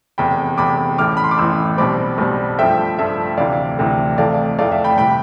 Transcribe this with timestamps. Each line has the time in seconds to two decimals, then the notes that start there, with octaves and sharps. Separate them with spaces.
0.18 F1 E2 C3 G5 B5
0.58 F1 E2 C3 B5 D6
0.98 A1 A2 E3 D6 F6
1.17 B5
1.24 C6
1.31 D6
1.38 A1 A2 E3 C6 E6
1.78 B1 B2 G3 C4 B5 D6
2.18 B1 B2 G3 C4
2.58 G2 F3 A3 E5 G5
2.98 G2 F3 A3 E5
3.37 D2 C3 E3 D5 F5
3.79 D2 C3 E3
4.18 F1 F2 E3 A3 D5 F5
4.58 F1 F2 E3 A3 D5 F5
4.72 E5
4.84 G5 B5
4.98 C3 E3 G3 G5 B5